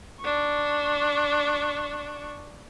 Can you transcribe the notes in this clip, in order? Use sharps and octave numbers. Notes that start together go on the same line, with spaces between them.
D4 C#6